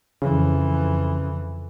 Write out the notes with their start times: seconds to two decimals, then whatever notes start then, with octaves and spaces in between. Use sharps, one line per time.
0.22 F2 C#3 E3